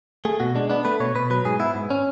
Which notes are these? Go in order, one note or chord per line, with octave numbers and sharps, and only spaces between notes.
A3 G#4
B2 F#4
G#3 D4
B3 D4
A3 B4
B2 C#5
B2 B4
F#3 B4
G#2 G#4
B3 E4
G#2
C#4